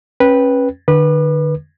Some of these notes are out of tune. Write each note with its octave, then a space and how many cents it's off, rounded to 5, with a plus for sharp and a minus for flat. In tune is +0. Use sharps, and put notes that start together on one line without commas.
C#4 -25 B4 -10 G5 +0
D3 +40 B4 -15 D6 +40